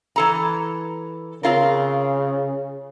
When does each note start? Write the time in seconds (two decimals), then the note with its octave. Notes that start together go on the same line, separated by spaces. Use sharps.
0.16 E3 A4 A#5
1.43 C#3 C4 F4 A#4